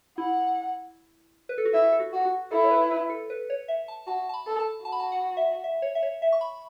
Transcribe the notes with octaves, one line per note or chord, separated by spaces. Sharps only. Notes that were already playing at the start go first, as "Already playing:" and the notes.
E4 F#5
B4
A4
F#4
E4 E5
A4
F#4
F#4
F#4
E4 A4
C#5
B4
B4
A4
B4
C#5
E5
A5
F#4 A5
A5
B5
A4
A5
F#4 A5
B5
A5
F#5
E5
E5
C#5
E5
C#5
E5
C#6
B5